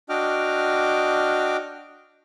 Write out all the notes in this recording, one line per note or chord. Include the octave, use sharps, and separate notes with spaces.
D4 F#4 D#5 G5 D6 F6